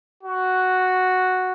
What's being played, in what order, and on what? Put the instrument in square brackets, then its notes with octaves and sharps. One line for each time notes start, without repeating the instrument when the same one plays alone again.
[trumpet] F#4